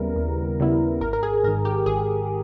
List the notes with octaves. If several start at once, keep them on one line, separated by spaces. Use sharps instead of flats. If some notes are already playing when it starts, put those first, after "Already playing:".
Already playing: D#2 C#3 G3 B3 E4 A#4
D#2
C#3 G3 B3 E4
G#1 A#4
A#4
G#4
G#2 D#3 A#4
G4
G#1 G#4